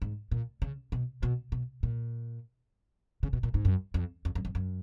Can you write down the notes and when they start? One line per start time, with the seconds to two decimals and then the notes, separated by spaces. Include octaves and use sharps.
0.02 G#2
0.31 A#2
0.62 C#3
0.92 B2
1.23 B2
1.52 B2
1.83 A#2
3.23 C#3
3.33 B2
3.43 A#2
3.54 G#2
3.65 F#2
3.94 F2
4.25 F2
4.35 F#2
4.45 F2
4.55 F#2